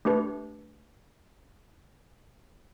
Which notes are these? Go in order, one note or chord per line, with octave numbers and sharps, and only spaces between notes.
A3 D4 G4 B4